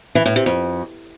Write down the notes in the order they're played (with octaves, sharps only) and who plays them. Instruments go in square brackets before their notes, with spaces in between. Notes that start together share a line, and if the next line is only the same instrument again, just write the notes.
[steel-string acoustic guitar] E3
A2
C3
F2